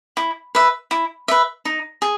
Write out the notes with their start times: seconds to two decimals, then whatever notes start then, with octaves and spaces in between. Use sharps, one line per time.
0.17 E4
0.55 B4 E5
0.91 E4
1.28 B4 E5
1.65 D#4
2.02 G#4